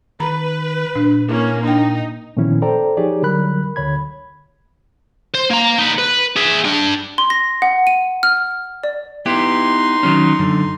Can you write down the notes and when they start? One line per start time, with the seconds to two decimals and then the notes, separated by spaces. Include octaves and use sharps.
0.20 D#3 B4 A#5 B5
0.95 A#2 D4
1.29 A#3 C#4 E4
1.63 D4 D#4 G5
2.37 A#2 D#3 F3 B3 C#4 E4
2.62 A4 C5 D5 G5 A#5
2.97 F3 D#4 G4 G#4 C#5 D5
3.22 D3 F#3 G3 A#4 B5 F#6
3.76 D2 D3 C#5 B5 G#6
5.34 C5
5.50 A#3 A#5
5.78 D#4 B4
5.99 B4
6.36 G#4 E5
6.65 D4 G5
7.18 C6
7.30 A#6
7.62 F#5
7.87 D#7
8.23 F6
8.84 D5
9.26 B3 D#4 E4 G4 C6
10.03 D#3 F#3 C#4
10.39 F#2 D3